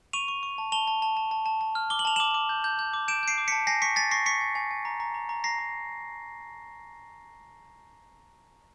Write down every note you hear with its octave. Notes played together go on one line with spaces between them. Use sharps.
C#6 D#7 F7
C#6
C#6
A5
A5 F7 G7
A5
A5
A5
A5
A5
A5
F6
D6 G7
F#7
A5 F7
D6 E7 F#7
D6
G6
G6
G6
D6
G6 D7 E7
G6 C7 D7
D6
A5 B6 C#7
G#5 A#6 C7
C#6 B6 C#7
G#5 A6 B6
C#6 A#6 C7
C#6 B6 C#7
G#5
G#5
G#5
A#5
A#5
A#5
A#5
A#5 A#6 C7
A#5